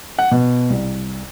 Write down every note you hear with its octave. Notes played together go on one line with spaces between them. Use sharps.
F#5
B2
C2